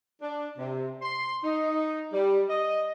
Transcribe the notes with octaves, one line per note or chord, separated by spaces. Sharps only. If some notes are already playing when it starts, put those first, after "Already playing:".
D4
C3
C6
D#4
G3
D#5